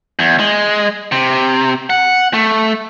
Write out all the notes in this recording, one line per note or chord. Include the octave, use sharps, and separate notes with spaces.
E2
G#3
C3
F#5
A3